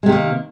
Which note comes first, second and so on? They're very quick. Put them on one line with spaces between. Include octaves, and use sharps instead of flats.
G#3 C3 D#3 A#3